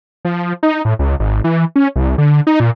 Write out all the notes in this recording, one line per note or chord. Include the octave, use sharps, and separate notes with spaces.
F3
D#4
A2
C#2
G#1
E3
C#4
C2
D3
D#4
A#2